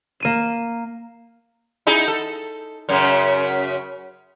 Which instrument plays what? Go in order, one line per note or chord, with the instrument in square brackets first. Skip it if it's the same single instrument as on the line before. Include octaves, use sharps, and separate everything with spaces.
[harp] A#3 D#7 E7
[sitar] D#4 E4 G#4
A4
F#2 C#3